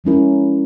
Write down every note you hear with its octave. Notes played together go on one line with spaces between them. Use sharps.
F3 G#3 C#4 E4 A#4